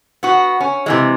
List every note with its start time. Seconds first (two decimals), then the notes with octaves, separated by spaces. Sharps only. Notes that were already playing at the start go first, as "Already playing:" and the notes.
0.23 B3 F#4
0.60 C#4
0.86 C3 E3 G#3